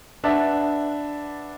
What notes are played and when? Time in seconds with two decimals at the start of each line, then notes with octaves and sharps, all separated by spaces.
0.24 D4 B4 E5 F#5 A5